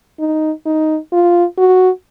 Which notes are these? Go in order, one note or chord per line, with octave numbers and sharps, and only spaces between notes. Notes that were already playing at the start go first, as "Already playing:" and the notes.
D#4
D#4
F4
F#4